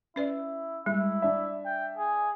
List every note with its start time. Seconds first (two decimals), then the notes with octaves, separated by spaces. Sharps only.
0.16 C#4 E4 B4 D5
0.86 G3 G#3 E4
1.22 D4 E5
1.65 G5
1.98 G#4